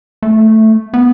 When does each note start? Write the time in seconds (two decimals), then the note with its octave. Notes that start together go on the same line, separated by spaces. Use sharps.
0.22 A3
0.94 B3